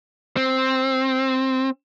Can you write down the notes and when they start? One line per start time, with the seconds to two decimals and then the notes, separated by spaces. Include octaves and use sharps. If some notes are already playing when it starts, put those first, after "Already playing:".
0.37 C4